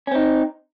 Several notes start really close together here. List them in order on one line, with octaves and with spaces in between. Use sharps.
C#4 C4 D#4